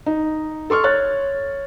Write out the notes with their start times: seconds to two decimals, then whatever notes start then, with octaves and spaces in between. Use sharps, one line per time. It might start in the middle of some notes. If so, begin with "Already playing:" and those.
0.06 D#4
0.70 A4 C6 C#6 F6
0.84 C#5 F#6 A6